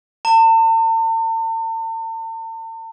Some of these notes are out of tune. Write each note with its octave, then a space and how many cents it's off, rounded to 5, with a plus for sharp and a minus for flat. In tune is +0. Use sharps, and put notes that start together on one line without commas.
A5 +45